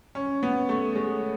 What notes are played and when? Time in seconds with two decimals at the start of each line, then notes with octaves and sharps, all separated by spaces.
0.15 C#4
0.43 B3
0.69 A3
0.95 G#3